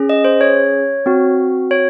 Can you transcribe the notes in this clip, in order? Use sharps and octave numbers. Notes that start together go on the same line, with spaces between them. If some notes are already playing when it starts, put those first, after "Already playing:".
Already playing: C#4 G#4
D#5
C5
C#5
C4 F#4
C#5